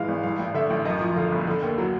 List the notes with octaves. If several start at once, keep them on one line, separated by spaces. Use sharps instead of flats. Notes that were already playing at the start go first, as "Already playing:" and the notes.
Already playing: G#2 E3 G#3 F5
G#1
G2 F5
A1
D3 E5
A1
F#2 D#5
F3
D3 F5
G1
D3
D#2
F#3